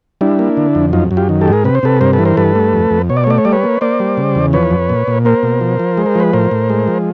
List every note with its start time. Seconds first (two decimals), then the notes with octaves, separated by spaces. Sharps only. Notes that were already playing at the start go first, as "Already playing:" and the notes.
0.21 G3 D4 E4
0.39 A#3
0.57 D3
0.75 F2
0.93 F#2 D#4 F4
1.11 F#2
1.17 F4 G4
1.29 D#3
1.41 G4 A4
1.48 G#2
1.53 G#4 A#4
1.65 C3 B4
1.75 C5
1.83 C3 A4 B4
2.01 G2 A#4 C5
2.13 A4 B4
2.19 E3
2.25 A#4 C5
2.37 G2 A4 B4
2.55 A3
2.73 F2
2.91 F2
3.10 B2 C#5
3.17 D5
3.24 C#5
3.27 A3 D5
3.38 C#5
3.45 G3 D5
3.52 B4 C#5
3.64 A#3
3.81 A#3 C5 D5
4.00 G3
4.17 C#3
4.35 E2
4.53 F3 B4 C#5
4.71 F2
4.89 A#2
5.07 A#2
5.25 A#3 A#4 C5
5.43 B2
5.61 F3
5.79 F3
5.97 G#3
6.06 A#4
6.15 F3 B4
6.33 A2 A#4 C5
6.51 A2
6.70 G#3
6.87 F3